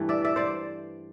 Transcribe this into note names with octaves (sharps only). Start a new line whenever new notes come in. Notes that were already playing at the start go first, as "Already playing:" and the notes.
Already playing: G2 E3 A3
D5 E5
D5 E5
C5 D5